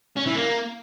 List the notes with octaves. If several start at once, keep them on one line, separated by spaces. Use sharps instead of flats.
C#4
E3
A#3